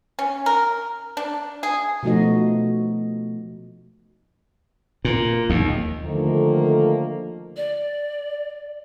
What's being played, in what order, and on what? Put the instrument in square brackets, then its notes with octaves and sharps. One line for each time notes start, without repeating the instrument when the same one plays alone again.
[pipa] C#4
A#4
D4
G#4
[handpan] B2 F3 A3 D#4 F#4 D#5
[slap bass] A#2
D#2
[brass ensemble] D3 D#3 F3 A3 A#3
[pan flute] D5